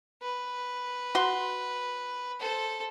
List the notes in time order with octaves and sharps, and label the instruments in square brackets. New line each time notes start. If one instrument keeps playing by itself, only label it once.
[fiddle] B4
[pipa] F#4 C6
[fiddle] A4 C5